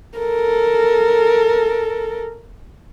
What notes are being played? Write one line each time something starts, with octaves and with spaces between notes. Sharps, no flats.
A4 A#4